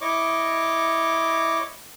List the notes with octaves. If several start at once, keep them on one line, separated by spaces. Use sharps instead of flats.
E4 C#5 D#5 C#6 D6